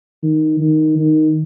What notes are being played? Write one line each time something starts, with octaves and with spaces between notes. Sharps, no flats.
D#3
D#3
D#3